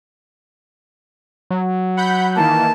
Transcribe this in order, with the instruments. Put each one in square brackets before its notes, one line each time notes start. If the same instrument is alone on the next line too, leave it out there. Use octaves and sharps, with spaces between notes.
[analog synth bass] F#3
[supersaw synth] F#5 B5 G6
[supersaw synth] D#3 E3 A#3 [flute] A5